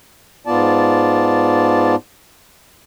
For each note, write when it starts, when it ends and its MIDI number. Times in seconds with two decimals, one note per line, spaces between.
0.47 1.95 44
0.47 1.95 59
0.47 1.95 65
0.47 1.95 74
0.47 1.95 81